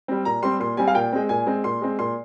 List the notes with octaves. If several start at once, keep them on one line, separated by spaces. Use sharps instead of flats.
G3 C4
A#2 A#5
G3 C4 C6
A#2 C6
G3 C4 G#5
F5
A#2 G5
G#3 C4
A#2 G#5
G#3 C4
A#2 C6
G#3 C4
A#2 C6